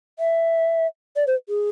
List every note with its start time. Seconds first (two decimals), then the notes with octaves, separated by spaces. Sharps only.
0.19 E5
1.16 D5
1.27 C5
1.49 G#4